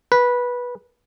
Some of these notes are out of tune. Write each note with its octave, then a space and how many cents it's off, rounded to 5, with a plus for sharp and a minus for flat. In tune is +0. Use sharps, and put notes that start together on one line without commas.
B4 -15